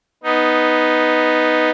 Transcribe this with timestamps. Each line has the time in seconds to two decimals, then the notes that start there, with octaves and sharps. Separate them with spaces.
0.24 B3 D#4